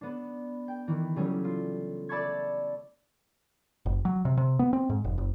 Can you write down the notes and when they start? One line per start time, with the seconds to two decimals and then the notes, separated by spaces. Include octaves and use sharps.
0.01 B3 D4
0.68 G5
0.88 D#3 E3
1.16 C#3 F#3 G3 A3 C#4
1.44 F4
2.09 D5 E5 A5 B5 C#6 G#6
3.86 F#1
4.05 F#3
4.25 C3
4.37 C3
4.59 B3
4.73 C4
4.89 G#2
5.04 F1
5.18 F#1